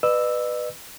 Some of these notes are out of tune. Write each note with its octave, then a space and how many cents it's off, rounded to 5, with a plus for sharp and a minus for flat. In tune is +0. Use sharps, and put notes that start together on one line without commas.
B4 +5 D#5 -45 E6 +0